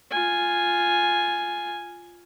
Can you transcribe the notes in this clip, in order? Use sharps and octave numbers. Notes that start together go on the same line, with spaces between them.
F4 G#5